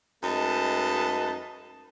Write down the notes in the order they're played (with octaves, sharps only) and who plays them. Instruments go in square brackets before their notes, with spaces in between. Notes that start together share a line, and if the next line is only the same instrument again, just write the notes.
[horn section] F#2 G#3 A3 D#4 B4 A5